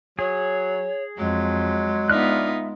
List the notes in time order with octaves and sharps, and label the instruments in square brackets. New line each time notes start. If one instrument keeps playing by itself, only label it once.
[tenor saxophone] F#3 [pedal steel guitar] G#4 [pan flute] C#5
[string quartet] F2 [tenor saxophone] F#3 [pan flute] G#3
[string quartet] B3 D#4 F4 [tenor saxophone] D4 [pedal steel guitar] E5 F6 F#6